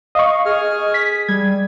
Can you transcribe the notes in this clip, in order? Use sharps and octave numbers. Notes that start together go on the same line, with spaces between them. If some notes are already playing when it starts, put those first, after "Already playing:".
D#5 F5 C#6
G#4 F6
B6
G3 G#6